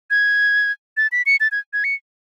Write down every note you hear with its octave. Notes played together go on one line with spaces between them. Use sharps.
G#6
A6
B6
C#7
A6
G#6
G#6
C#7